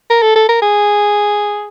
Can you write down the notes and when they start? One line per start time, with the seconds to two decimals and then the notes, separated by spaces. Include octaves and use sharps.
0.10 A#4
0.22 A4
0.36 A4
0.49 A#4
0.62 G#4